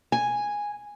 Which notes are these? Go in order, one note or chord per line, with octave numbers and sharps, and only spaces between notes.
G#5